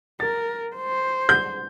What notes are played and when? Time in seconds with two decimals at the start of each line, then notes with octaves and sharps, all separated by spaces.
0.20 A#4 A6
0.75 C5
1.29 G6